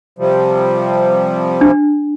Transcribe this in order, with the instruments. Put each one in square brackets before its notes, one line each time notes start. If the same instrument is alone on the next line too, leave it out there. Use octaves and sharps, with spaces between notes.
[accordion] C3 F3 G3
[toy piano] D4